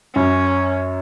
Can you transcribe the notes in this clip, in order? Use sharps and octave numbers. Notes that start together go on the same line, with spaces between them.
F#2 C#4